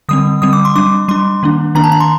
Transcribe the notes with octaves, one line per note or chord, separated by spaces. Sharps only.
D3 G3 C4 D#6
D3 G3 C4 D#6
D6
C6
G3 D4 D6
G3 D4 C6
D#3 A#3 D4
D#3 A#3 D4 A#5
A5
A#5
C6